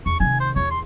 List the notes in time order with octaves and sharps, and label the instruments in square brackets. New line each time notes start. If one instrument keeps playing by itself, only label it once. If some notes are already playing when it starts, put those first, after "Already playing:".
[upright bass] E2 [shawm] C#6
[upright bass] C3 D#3 [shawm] G#5
[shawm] C5
[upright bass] E2 [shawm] C#5
[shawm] C6